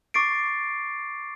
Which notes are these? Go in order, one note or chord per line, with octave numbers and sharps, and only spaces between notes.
C#6 D6 A6 C7 D7